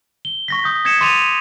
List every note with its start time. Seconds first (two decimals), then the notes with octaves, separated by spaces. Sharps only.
0.25 G7
0.48 C#6 A#6 B6
0.64 D#6 G6
0.85 D#6 G#6 B6 C#7 E7
1.01 C6 D6 A6 D#7 F7